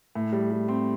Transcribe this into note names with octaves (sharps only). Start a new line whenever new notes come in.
A2
G3
G3
C4